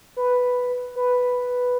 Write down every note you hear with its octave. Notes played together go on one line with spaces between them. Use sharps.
B4
B4